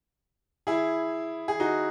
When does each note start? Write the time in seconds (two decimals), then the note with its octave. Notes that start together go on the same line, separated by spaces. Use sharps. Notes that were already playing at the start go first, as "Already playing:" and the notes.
0.67 E4 G#4
1.48 G#4
1.60 D#4 F#4